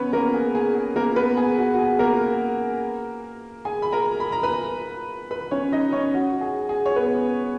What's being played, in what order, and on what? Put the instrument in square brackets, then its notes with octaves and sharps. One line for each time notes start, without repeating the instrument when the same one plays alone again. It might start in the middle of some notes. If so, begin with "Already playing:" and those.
Already playing: [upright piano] B3 C#4 B4 C#5
A#3 A#4
G#4
G#4
G#4
A#3 A#4
B3 B4
G#4
F#4
F#4
G#4
A#3 A#4
G#4 G#5
B5
A#4 A#5
B5
A#5
B4 B5
B4 B5
C#4 C#5
D#4 D#5
C#4 C#5
F#4
G#4
G#4
C#5
B3 B4